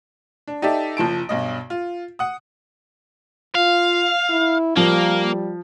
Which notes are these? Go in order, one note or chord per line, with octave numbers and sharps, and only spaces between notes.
D4
D#4 G4 A4 D5 E5
F#1 F3 A5 D7
B1 G2 D#5
F4
F#5 D#6
F4 F5
E4
F3 G3 A#3